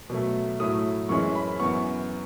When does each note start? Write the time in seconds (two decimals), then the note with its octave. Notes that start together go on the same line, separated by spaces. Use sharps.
0.10 B2 F#3 A3
0.60 A2 F#3 A3 E4 D#6
1.09 F#2 E3 G#3 C#4 C#6
1.35 B5
1.60 F#2 E3 B3 C#6